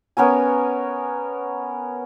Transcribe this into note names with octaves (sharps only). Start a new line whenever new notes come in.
B3 C#4 A#4 G#5